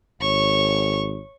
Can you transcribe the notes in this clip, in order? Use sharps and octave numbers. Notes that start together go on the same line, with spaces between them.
G#1 C#5 C#6